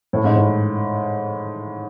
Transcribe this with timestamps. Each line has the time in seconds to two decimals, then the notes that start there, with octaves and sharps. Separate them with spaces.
0.13 A2
0.24 G#2
0.36 A2